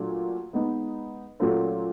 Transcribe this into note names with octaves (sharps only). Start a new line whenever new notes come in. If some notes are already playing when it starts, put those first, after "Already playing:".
Already playing: A#2 F#3 A3 D4 F4
G#3 B3 D#4
A#2 F#3 A3 C#4 F4